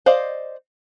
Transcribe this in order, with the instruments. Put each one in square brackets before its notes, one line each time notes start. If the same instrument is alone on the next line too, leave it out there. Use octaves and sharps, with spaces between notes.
[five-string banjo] C5 D5 D#5 F5